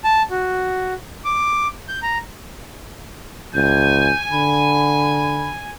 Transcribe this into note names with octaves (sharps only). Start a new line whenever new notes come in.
A5
F#4
D6
G6
A#5
C#2 G#5 G6
D3 B5